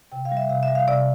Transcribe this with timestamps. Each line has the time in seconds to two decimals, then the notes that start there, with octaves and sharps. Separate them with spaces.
0.12 C3 G5
0.25 F5
0.32 G3
0.37 E5
0.49 C3 F5
0.63 E5
0.68 G3
0.75 F5
0.88 C3 D5